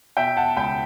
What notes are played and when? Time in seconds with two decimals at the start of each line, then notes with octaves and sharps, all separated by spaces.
0.17 B2 E5 G5
0.37 F#5 A5
0.57 C#2 G5 B5